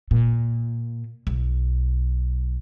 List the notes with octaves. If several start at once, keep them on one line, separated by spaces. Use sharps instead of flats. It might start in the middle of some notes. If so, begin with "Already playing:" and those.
A#2
B1